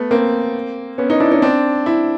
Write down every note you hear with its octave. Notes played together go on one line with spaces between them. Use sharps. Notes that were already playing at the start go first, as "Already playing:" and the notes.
Already playing: A3 B3
A#3 C4
B3 C#4
C#4 D#4
D4 E4
C#4 D#4
C4 D4
D4 E4